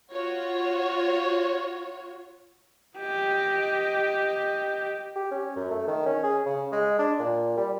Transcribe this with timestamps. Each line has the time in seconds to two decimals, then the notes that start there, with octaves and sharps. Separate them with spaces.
0.12 F4 F#4 C#5
2.98 G4 D#5
5.16 G4
5.32 C#4
5.56 F#2
5.70 A3
5.87 D#3
6.06 C#4
6.23 G#4
6.46 C#3
6.72 G#3
6.99 D4
7.19 A#2
7.57 G3